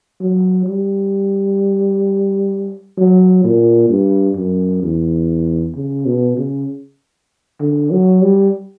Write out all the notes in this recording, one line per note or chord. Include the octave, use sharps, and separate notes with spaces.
F#3
G3
F#3
A#2
G2
F#2
E2
C#3
B2
C#3
D3
F#3
G3